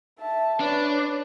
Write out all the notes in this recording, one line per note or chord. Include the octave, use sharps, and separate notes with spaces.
E5 A5
D4 B4 C#5